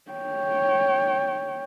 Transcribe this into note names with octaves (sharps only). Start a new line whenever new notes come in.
C#5 G5